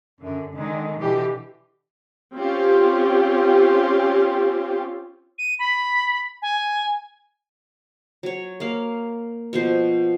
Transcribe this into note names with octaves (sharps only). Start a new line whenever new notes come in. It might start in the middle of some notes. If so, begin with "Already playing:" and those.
F#2 D3
D3 D#3 G#3
B2 D3 E3 G4
C4 C#4 F4 G4
D#7
B5
G#5
F#3 C#5
A#3 F5
B2 F3 C5